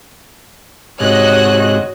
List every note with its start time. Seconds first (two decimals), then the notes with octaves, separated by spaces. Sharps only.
1.00 G#2 C3 F#4 C#5 D#5 F#6